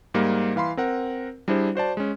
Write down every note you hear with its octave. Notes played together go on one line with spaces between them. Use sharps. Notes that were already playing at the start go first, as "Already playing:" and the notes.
G#2 G3 A#3
E3 F5 B5 C6
C4 A#4 F#5
G3 D4 E4 G#4 C5
F#4 C5 D5 A5
G#3 C#4